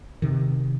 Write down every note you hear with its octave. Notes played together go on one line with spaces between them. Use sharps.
C3 D#3